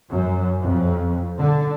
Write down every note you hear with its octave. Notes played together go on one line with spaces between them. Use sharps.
F#2
F2
D3